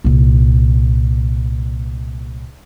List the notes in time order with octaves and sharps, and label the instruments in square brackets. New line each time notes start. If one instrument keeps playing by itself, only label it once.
[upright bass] C2 A#2